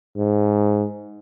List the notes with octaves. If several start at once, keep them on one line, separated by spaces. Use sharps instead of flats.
G#2